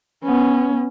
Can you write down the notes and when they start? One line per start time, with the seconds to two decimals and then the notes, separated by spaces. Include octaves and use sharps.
0.24 B3 C#4